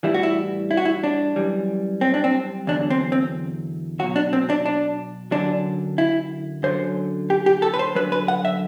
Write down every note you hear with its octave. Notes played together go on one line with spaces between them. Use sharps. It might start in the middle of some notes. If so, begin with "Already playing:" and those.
A2 E3 G3 E4
F#4
E4
E4
F#4
E4
D4
F#2 E3 G3
C4
D4
C4
E2 D3 F#3 D4
C4
C4
B2 F#3 F#4
D4
C4
D4
D4
F#2 D3 F#3 D4
E4
F#2 D3 F#3 C5
G4
G4
A4
B4
C5
F#2 D3 F#3 B4
B4
F#5
E5